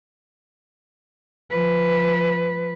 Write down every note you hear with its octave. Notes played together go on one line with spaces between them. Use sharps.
F3 B4